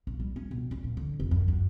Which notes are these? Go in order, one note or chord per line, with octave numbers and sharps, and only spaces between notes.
B1
G3
C#4
B1
C#4
A#2
D3
F1
F#2
F#2